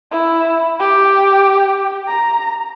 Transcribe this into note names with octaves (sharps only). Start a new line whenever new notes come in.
E4
G4
A#5